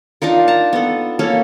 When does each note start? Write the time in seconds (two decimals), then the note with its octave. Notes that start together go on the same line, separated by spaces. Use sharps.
0.22 D4 D#4 F4 A#4
0.48 A5 A#5
0.73 B3 A4
1.19 A#3 C#4 A4